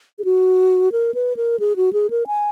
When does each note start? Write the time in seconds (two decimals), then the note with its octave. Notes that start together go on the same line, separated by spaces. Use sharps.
0.19 G#4
0.25 F#4
0.92 A#4
1.14 B4
1.37 A#4
1.60 G#4
1.76 F#4
1.93 G#4
2.10 A#4
2.27 G#5